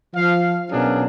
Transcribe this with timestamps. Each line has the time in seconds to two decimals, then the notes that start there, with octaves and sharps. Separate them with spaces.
0.14 F3 F5
0.71 B2 F#3 C#4 D4 G#4 A#4